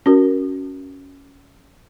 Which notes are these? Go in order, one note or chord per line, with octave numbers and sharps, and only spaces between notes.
C#4 F#4 A#4